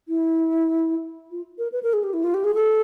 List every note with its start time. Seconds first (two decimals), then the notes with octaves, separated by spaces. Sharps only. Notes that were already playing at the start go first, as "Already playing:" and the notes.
0.08 E4
1.31 F4
1.58 A#4
1.72 B4
1.83 A#4
1.93 G#4
2.04 G4
2.14 E4
2.24 F4
2.34 G4
2.44 G#4
2.55 A4